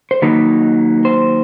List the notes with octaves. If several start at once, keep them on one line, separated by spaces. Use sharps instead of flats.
C5
D#3 F#3 A#3 D#4 B4
C5